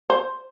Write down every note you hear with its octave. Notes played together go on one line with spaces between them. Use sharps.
C5